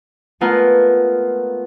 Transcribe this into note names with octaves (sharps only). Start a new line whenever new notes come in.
G#3 A3 B3 F4 A#4